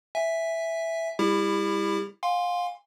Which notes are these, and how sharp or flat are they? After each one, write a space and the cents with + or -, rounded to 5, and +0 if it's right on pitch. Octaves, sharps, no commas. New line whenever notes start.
E5 +0 G#5 -15
G3 +25 E4 +0 G4 +35
F5 +25 G#5 -35 C6 +0